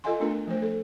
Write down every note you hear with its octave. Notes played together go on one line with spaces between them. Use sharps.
F4 A4 D#5 F5 G#5 C6
A3 B3 D4 F4 A#4
F3 A3 C5
A4